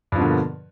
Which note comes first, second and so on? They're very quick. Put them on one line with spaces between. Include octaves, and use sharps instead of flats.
G2 F3 B2 D3 A#3